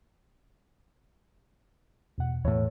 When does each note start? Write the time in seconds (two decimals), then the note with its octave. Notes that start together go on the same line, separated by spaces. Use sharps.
2.18 E2 B2 F#5
2.45 E2 A2 C#5